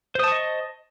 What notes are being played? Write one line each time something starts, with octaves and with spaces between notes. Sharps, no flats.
C5 D#5 A5 C#6 D#6